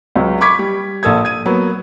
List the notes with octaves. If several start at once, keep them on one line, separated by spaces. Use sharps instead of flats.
C#2 F#3
B5 C#6 D6 G#6 B6
G3
A#1 A#3 A4 D#6 G#6
G#6 D#7
F#3 A#3 B3